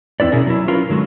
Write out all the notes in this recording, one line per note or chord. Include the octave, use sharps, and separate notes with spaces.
E2 C4 E4 B4 D5
B2 C#4 E4 G#4 A#4
F#3 E4
C#4 F4 A#4 B4
D3 F#3 G#3 F#4